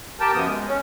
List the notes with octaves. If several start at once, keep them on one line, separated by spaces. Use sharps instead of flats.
G4 A#4 G5 A5
F#2 F3 B3 D#6
G#3
C#4